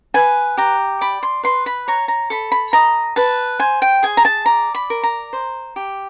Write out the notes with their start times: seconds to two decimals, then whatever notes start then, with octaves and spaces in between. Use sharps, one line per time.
0.14 B4 G#5
0.57 G4 A#5
1.01 D5 B5
1.23 C6
1.43 B4 C6
1.66 B5
1.88 C#5 A#5
2.08 A#5
2.30 A4 B5
2.52 B5
2.73 D#5 A#5
3.16 B4 A5
3.60 C5 G#5
3.82 G5
4.03 G#4 G#5
4.17 A#5
4.25 A5
4.46 D5 A#5
4.75 B5
4.90 A#4
5.03 A#5
5.33 C5
5.76 G4